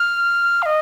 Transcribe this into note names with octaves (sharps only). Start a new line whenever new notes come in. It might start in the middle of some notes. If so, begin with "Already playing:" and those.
Already playing: F6
F5
D#5